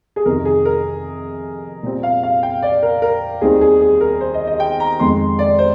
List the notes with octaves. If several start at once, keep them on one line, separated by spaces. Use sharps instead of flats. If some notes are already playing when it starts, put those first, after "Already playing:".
G#4
F2 C3 D#3 A#4
G#4
A#4
A#2 G3 C4
F5
F5
G5
D5
A#4
A#4
D#2 D#3 G3 C4 G#4
G#4
G#4
A#4
C5
D#5
D#5
G5
A#5
F2 D#3 G#3 C6
D5
C5